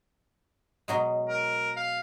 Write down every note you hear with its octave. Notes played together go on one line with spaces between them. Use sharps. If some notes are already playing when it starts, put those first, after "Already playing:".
B2 F#3 G#3
A#4
F5